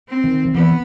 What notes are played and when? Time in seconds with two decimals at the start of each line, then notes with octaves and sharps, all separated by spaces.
0.09 C4
0.24 D#3
0.54 E3 B3